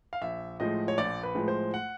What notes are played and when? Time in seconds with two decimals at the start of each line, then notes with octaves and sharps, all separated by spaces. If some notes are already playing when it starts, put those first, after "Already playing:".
0.13 F5
0.22 A#1 E5
0.60 A2 F3 G#3 D#5
0.88 C#5
0.98 A#1 D5
1.23 B4
1.35 A2 F3 G#3
1.48 C5
1.74 F#5